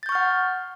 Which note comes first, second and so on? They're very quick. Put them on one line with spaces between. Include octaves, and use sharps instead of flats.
A6 G6 C#6 F6 F#5